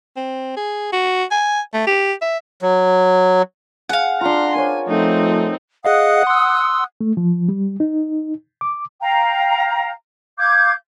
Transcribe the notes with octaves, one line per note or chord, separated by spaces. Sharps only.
C4
G#4
F#4
G#5
A3
G4
E5
F#3
G#4 F5 F#5
D4 F4 A#5 C6
A#4 C5 C#5 G#5
F3 A3 C4 D#4
G#4 D#5 F5 F#5 D#6 F#6
C6 E6
A3
F3
G3
D#4
D6
F5 G5 A#5
F5 D6 G6 G#6